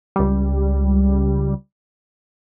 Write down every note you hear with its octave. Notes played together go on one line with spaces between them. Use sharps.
C#2 G3